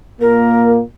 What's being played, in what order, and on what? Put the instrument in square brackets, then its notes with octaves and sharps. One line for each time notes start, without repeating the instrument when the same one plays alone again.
[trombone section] A#2 A#3 [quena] A#4